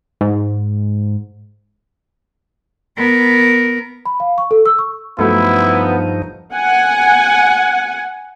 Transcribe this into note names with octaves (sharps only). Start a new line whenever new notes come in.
G#2
B3 A#4
B5
F5
C#6
A4
E6
C#6
G2 F3 F#3 A3 B3 D#4 E4 A4
F#5 G#5